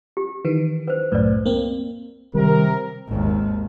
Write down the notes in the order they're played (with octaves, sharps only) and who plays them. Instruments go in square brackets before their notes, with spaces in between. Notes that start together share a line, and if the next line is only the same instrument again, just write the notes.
[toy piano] G4
[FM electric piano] D#3 E3 [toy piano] B4
[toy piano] B4 C5
[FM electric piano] C2 F#2 A2 [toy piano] B4 D5
[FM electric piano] A#3 C4
[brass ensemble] C3 A#4 [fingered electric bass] D#3 G3
[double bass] G#1 D#2